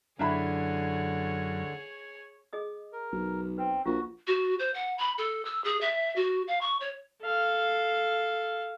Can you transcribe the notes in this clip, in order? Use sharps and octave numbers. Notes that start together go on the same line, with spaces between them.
F#2 D3 D4 E4 G#4 C#5 B5
G#4 D#5 D#6
A#4
B1
C4 B4
A#1 F4 F#4 A#4 C#6
F#4
C5
F#5
B5
A4
E6
G#4
E5
F#4
F5
C#6
C#5
A4 F5